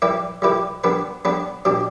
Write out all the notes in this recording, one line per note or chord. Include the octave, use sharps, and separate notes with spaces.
G3 E4 G4 B4
G3 E4 G4 B4
G3 B3 D4 B4
G3 B3 D4 B4
B2 G3 D4 G4